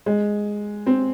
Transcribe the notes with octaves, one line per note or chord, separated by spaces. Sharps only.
G#3
C4